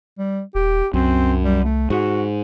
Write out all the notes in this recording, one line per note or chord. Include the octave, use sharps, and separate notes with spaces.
G3
D#1 G4
C2 F#2 C4
G3
A3
G#2 F#4